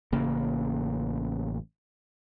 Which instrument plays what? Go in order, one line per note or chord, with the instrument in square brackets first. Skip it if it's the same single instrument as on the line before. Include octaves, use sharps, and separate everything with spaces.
[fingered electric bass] A1 C#3 A#3